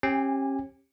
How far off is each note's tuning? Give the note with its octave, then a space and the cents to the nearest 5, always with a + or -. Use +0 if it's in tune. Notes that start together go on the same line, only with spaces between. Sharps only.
C#4 -35 G4 +0 G#5 -20